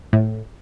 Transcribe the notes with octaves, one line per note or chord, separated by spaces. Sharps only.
A2